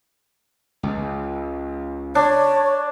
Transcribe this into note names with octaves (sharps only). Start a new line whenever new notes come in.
C#2
D4 C#5